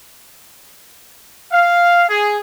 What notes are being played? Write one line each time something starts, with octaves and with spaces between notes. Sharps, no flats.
F5
G#4